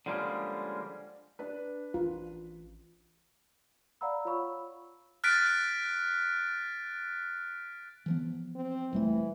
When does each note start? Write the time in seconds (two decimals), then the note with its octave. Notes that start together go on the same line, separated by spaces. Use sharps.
0.06 D3 F3 G3 G#3 A#3 C#4
1.39 D4 B4
1.94 A1 F4
4.01 D5 F5 F#5 A#5 B5 E6
4.25 F4 C#5 F5 B5 C#6 E6
5.24 F6 F#6 A6 B6 D7
8.06 E3 F3 B3
8.56 C4
8.93 D#1 E3 G3 A3